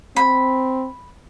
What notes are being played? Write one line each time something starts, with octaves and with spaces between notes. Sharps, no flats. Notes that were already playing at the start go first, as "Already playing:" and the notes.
C4 B5